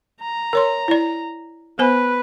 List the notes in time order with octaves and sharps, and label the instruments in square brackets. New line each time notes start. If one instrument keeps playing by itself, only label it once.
[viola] A#5
[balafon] A#4 C#5 C6
E4 D5
[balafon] B3 C5 G#5 [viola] B4